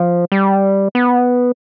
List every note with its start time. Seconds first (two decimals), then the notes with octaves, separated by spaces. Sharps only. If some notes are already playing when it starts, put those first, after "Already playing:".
Already playing: F3
0.32 G3
0.95 B3